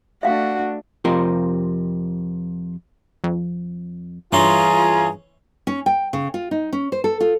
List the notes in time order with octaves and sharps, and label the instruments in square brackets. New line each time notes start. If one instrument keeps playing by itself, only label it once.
[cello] A3 D4 [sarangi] F#4 [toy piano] E5 F5
[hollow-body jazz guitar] F2 C3 F4 G4 A#4 C6
[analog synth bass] F2
[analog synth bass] G2 [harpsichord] E3 C#4 C6 [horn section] F4 G#4 [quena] A#5
[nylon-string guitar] C#4
G5
C#3
F4
D#4
C#4
C5
A4
F4